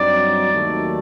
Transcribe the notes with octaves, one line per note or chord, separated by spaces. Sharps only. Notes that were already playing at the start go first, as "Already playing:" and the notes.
Already playing: G2 F#3 C4 D#4 D5
D#2 D#3 F#3 A3